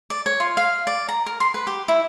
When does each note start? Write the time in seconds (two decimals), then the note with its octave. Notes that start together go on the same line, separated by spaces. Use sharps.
0.10 D5
0.26 C#5
0.40 F4
0.57 F5
0.87 D5
1.09 A#5
1.26 A#4
1.40 C6
1.54 B4
1.67 G4
1.88 E4